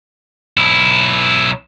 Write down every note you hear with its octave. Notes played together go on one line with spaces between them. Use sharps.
B1 E4